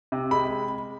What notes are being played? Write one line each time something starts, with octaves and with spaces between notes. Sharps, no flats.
C3
G#3 B5